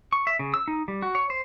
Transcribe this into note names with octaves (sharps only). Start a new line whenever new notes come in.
C#6
E5
C#3
E6
D#4
G3
F#4
C#5
C5